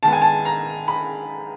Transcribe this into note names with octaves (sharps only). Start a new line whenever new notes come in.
G#2 D#3 G#3 B3 A5
G#5
A5
A#5
B5